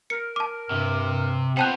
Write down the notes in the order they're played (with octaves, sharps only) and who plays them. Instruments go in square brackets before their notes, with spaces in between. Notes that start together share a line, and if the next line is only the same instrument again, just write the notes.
[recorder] A#4 [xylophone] C#7
[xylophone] A5 D6
[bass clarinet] G2 [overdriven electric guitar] C3
[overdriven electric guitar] B3 F4 [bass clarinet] C4 [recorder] C5 [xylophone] G5 A5 F#6